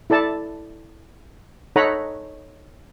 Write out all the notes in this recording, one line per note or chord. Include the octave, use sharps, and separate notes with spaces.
E4 A4 D5 A5
D#4 A4 C#5 F#5 A#5 B5